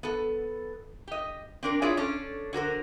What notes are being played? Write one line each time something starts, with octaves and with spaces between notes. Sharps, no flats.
B3 A4
G4 D#5
C4 D4 A#4
E4 F4 G#4 C#5 D5 E5
C#4 D4 A4
D3 F#4 A#4 C5